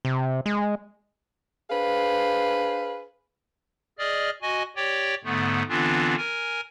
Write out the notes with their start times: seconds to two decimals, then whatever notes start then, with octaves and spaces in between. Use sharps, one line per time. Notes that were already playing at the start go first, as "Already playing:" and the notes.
0.05 C3
0.46 G#3
1.71 D4 G#4 B4 C5 F5
3.99 G#4 D5 D#5 F6
4.42 F#4 D#5 G#5
4.76 G4 C#5 D5 G5
5.24 G#2 D3 A3 B3
5.69 D3 E3 B3 C4 D4 F4
6.17 A#4 G#5